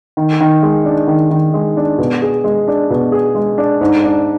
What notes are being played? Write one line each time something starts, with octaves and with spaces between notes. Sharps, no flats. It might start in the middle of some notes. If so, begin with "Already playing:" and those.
D#3
D#3
G#3
D4
D#3
D#3
G#3
D4
B2
G#4
G#3
D4
B2
G#4
G#3
D4
G#2
D4